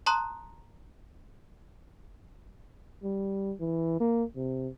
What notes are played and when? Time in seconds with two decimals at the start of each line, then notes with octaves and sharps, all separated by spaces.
0.06 A5 A#5 C6 D#6 F#6
3.04 G3
3.60 E3
4.00 A#3
4.36 C3